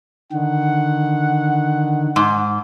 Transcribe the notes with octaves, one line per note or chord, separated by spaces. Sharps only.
D3 D#3 F#5
G#2